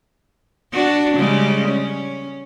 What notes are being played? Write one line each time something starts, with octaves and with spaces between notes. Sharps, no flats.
D4 F#4
C#3 G3 G#3
C#4